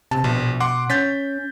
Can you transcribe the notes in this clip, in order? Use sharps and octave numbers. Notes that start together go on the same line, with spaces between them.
C3 A5
A#1 B2
F#5 C6 D6
C#4 G6 A6 B6